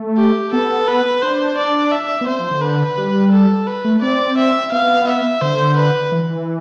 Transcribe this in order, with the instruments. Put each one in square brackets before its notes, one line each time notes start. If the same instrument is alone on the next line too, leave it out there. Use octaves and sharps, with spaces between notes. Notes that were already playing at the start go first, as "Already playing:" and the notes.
Already playing: [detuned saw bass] A3
[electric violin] G4
[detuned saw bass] B3 [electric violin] A4
[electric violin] B4
[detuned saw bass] D4 [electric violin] C5
[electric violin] D5
E5
[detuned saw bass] B3
[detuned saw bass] C4 [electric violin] C5
[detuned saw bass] F3
D3
[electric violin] B4
[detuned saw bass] G3
[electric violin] A4
B4
[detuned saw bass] A3
[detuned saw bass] C4 [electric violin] D5
[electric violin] E5
[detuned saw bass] B3 [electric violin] F5
[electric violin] E5
[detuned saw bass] D3 [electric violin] C5
[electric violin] B4
[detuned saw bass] E3